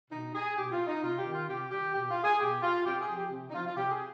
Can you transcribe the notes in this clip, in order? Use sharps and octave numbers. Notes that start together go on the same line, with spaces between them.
B2 D#4
G#4
B2 G4
F4
D#4
C3 F4
G4
D#3
F4
C3 G4
D#3 G4
B2 G4
F4
G#4
B2 G4
F4
C3 G4
G#4
F3
G4
C3
D#4
F3 F4
F4
C3 G4
G#4